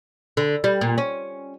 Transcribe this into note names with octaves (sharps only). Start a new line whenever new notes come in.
D3
G3
A#2
C#4